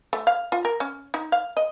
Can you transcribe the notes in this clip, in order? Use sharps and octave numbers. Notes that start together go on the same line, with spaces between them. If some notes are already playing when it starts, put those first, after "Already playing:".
A3
F5
F4
A#4
C#4
D#4
F5
D#5